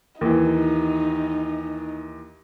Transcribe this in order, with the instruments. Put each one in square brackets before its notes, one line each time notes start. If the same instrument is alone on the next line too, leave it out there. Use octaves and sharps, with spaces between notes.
[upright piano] D#2 E3 [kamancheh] D#4